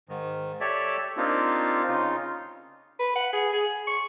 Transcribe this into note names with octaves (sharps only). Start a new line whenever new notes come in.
G#2 D#3
G4 A4 C#5 D5 E5
A#3 C4 D4 D#4 F4 G4
C#3 D#4 F4
B4
F#5
G#4
G#4
C#6